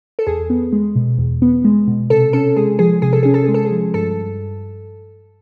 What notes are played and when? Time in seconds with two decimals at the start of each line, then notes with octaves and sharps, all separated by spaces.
0.19 A4
0.27 E2 G#4
0.50 B3
0.73 G#3
0.96 B2
1.18 E2
1.42 B3
1.65 G#3
1.87 B2
2.10 C3 A4
2.33 C#4 A4
2.56 G#3 G#4
2.79 F3 G#4
3.02 C3 G#4
3.13 A4
3.23 C#4 G#4
3.34 A4
3.44 G#3 G#4
3.54 A4
3.65 G#4
3.71 F3
3.94 G2 A4